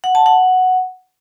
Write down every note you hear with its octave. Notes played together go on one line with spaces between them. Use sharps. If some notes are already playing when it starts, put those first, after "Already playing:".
F#5
A5
F#5